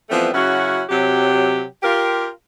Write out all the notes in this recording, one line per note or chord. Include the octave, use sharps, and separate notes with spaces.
E3 F3 G3 A3 B3 C4
C#3 F#3 C#4 E4 F#4
C3 F#3 G4
F4 G4 A#4